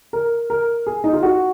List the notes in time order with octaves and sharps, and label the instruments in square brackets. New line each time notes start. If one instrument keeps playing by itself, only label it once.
[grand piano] A#4
A#4
G#4
D#4
F4
F#4